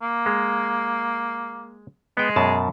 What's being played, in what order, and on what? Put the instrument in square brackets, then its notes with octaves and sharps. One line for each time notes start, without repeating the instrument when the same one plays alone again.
[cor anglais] A#3
[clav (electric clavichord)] G#3
[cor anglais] G#3 [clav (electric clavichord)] B3 G5
[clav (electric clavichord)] F#2 B2 A5